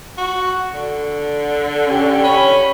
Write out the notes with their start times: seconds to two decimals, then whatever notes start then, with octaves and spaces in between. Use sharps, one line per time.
0.18 F#4
0.74 D3
1.86 C#4 G4
2.24 C#4 B5